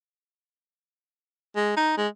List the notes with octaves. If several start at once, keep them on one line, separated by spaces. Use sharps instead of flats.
G#3
D#4
G#3